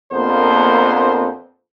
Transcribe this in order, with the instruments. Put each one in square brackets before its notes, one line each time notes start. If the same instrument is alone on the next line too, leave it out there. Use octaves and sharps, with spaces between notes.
[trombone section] A#1 F2 A#3 B3 C5